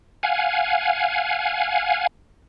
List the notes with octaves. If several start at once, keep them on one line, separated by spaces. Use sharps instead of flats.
F5 F#5 G#5